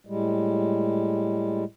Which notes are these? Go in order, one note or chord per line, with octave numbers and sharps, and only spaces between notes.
A2 G3 G#3